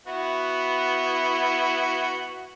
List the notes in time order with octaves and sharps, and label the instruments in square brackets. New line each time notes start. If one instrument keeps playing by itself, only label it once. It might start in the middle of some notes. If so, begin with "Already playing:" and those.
[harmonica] B3 E4 F#4